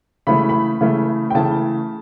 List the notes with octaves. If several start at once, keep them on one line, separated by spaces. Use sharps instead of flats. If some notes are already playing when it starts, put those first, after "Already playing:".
C#3 E3 A3 B5
B5
C#3 E3 A3
G5
C#3 E3 A3 A5